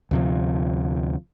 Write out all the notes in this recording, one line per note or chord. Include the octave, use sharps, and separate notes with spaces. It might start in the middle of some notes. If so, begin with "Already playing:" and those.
D2 C3 F3